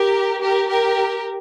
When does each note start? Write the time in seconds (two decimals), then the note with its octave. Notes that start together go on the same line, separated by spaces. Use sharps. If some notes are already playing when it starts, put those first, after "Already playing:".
Already playing: G4 A#4
0.41 G4 A#4
0.69 G4 A#4